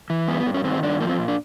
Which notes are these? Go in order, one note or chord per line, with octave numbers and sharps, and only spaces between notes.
E3
G2 B3
G2
C#4
D#3 C4
D#4
G2 D4
F3 A#3
C4
A#2
D4